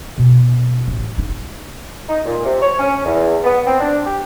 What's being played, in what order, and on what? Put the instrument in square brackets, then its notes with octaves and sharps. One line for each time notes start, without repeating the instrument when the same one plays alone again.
[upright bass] B2
A1
D#4
[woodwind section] D#4
A#2
C3
C#5
C#4
E2
B3
C4
D4
G4